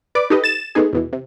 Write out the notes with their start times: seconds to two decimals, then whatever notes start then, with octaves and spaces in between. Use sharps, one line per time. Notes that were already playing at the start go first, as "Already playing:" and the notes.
0.15 B4 D5 D6
0.30 D#4 G4 A4 B4 D#5
0.44 A6 E7
0.75 G#3 A3 B3 D#4 G#4
0.93 E2 B2 E3
1.13 C3